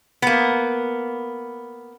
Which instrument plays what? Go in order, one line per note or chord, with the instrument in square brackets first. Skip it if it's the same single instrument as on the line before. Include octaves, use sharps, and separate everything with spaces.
[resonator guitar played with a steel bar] A#3 B3